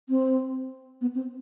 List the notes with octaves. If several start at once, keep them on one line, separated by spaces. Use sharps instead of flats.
C4
B3
C4